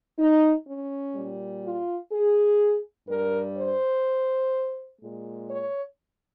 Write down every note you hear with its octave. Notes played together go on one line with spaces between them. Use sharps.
D#4
C#4
A#2 G3
F4
G#4
G2 G3 A#4
C5
A#2 G#3
C#5